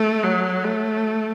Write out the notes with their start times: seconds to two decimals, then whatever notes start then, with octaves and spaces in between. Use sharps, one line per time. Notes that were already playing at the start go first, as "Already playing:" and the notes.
Already playing: A3
0.23 F#3
0.64 A3